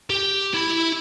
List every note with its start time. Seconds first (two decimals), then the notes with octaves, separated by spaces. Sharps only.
0.10 G4
0.54 E4 B5